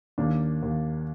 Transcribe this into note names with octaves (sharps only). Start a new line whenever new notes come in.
D#2 A#3 D4
D#2